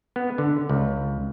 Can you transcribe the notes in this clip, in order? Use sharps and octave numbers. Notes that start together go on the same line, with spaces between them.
B3
D3
C#2